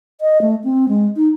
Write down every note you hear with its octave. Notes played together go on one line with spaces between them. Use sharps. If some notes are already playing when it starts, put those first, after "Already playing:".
D#5
A3
C4
G#3
D#4